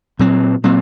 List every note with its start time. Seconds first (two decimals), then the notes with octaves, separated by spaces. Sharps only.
0.19 A#2 F#3 C4
0.64 A#2 F#3 C4